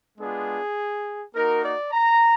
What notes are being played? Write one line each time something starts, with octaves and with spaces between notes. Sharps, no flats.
G#3 B3 D4 F4 G#4
A#3 D#4 F#4 A#4
D5
A#5